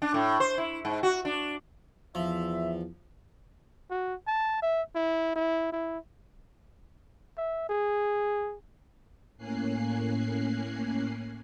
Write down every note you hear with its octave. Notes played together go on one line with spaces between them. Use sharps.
D4
A2
C5
E4
G#2
F#4
D4
E2 F3 E5
F#4
A5
E5
E4
E4
E4
E5
G#4
A2 A#3 C#4 G#5 F#6 C7